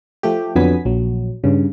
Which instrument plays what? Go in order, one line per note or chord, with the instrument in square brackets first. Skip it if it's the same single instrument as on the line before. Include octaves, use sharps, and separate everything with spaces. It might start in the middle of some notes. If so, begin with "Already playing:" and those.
[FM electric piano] F3 A3 G4
F2 D3 F#3 B3 G#5 B6
A#1 F#3
G2 C#3